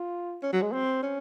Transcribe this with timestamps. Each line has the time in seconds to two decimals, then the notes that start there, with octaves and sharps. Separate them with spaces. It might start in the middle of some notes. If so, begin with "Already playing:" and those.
Already playing: F4
0.43 C#4
0.53 F#3
0.62 G#3
0.72 C4
1.03 C#4